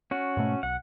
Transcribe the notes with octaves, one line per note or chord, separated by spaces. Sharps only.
C#4 F#4
G#2 B2 A3
B1 F#5